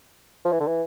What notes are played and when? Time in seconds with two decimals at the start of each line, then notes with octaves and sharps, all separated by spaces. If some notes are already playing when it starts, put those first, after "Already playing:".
0.45 F3
0.52 E3
0.60 D3
0.67 E3